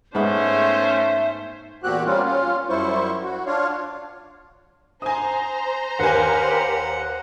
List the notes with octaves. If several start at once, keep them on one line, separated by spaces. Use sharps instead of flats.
G#2 A3 B3 C#4 C5 E5
E2 A#2 C4 F#4 G4 F#6
G3 A#3 C4 C#4 F4
C#4 F4
F#2 G3 E4 C5 C#6
F#4
D4 F4 C#5 F5
C5 G#5 A#5 D#6
D#2 G4 A#4 B4 F#5 G#5